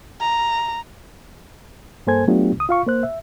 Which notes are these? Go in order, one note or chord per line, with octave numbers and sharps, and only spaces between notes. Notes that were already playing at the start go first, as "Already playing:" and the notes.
A#5
G2 A#3 A4 C5 G#5 G#6
F#3 A3 B3 D4 F4 G4
C#2 D#6
F4 F5 C#6
A#3 C5 F#6
E5